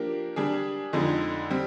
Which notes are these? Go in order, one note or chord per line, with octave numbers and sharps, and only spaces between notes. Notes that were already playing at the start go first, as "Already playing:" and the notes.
Already playing: F3 A#3 D4 G4 A#4
G3 D4 G#4
F2 D3 G#3 D#4
G3 C4